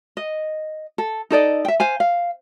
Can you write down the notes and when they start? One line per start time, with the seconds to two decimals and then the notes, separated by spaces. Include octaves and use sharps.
0.17 D#5
0.98 A4
1.31 D#4 A4 D5 D#5
1.65 E5 G5
1.80 C5 F5 G#5
2.00 F5